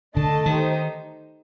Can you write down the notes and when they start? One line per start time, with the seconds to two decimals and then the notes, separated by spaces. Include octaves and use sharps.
0.16 D3 A3 D4 A4 D#5 A5
0.46 D#3 D#4 G4 C5